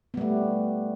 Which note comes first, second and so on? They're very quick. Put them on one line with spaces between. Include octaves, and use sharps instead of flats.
B3 G3 A3